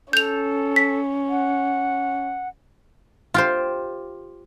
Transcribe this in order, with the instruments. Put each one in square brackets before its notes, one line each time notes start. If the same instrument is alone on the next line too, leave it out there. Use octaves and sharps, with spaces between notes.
[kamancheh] C#4 [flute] A4 [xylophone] G6 F7
[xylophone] B6
[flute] F#5
[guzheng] F4 G4 C5